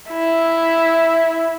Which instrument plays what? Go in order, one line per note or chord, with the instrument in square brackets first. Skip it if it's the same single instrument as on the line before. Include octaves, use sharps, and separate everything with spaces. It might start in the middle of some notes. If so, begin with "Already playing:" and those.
[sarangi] E4